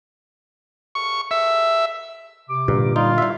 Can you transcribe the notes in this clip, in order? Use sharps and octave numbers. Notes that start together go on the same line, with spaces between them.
C#6
E5
C3 D6
G2 A#2 D3
G3 D#4 F4
G3 E4 E5 F5